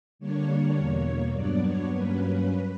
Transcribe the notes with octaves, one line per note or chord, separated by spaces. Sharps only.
D3 G3 A#3 D4 C#5
E2 B2 A#3
G2 F#3 B3 D4 D5
C#5
G2 F#3 A#3 C#4 B4